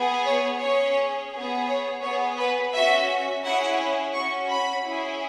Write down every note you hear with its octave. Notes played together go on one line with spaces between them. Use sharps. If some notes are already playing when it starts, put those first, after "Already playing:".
Already playing: B3 G#4
C#5
C#4 G#4 C#5
B3 G#4
C#5
B3 G#4 C#5
B4
C#4 F#4 E5
C#4 E4 G#4 F#5
C#4 F#4 C#6
B5
C#4 E4 G#4